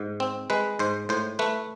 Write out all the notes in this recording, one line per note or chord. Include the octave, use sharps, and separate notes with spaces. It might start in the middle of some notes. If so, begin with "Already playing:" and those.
Already playing: G#2
C4
G#3 B4
G#2 C5
A2 C5
A3 B4